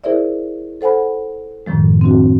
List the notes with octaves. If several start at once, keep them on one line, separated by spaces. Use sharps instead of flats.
E4 G#4 A#4 C5 D5 E5
A4 C5 F#5 G#5 B5
F#2 A2 D#3 F3 G#3
C4 D4 F#4